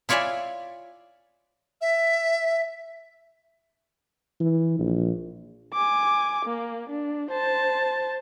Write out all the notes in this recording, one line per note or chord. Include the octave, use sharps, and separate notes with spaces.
E4 F4 C#5 D5 E5 G#5
E5
E3
A#1
G#5 D6
A#3
D4
C5 A5